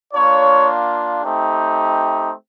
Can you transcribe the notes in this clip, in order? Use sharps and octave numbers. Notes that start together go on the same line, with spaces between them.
A#3 D4 F4 C#5
A3 C4 D#4 G4